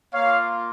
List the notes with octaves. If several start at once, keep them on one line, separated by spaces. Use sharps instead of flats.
A#3 F4 C#5 F5